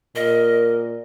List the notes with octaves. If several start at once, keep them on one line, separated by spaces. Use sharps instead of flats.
A#2 A#4 D#5